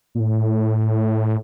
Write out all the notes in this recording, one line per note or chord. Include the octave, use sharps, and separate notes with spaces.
A#2
A2